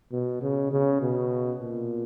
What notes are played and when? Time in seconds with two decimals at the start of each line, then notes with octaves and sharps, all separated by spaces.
0.11 B2
0.42 C#3
0.71 C#3
1.01 B2
1.61 A#2